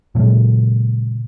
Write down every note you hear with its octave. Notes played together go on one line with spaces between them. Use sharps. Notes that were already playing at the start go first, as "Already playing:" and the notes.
A#2 C#3 F#3 G#3